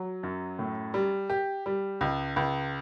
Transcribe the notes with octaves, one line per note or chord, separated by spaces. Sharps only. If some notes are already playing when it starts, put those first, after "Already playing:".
Already playing: F#3
F#2
A2
G3
G4
G3
C#2
C#2